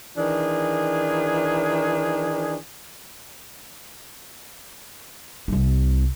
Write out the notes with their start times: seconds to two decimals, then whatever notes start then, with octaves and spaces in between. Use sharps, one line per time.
0.16 D#3 E3 D4 G#4
5.48 C2 G3